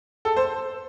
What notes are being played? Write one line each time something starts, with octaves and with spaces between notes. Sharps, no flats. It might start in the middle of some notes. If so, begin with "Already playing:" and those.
A4
C5